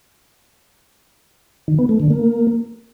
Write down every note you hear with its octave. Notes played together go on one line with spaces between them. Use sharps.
D#3
B3
A3
D3
A#3